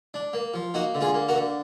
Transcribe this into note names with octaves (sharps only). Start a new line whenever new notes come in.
D4
A#3
F3
A#3 D#4 F#4
D3
F4 G#4
A#3
F#4 A#4
D3